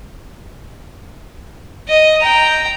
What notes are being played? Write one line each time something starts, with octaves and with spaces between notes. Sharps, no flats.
D#5
G5 A#5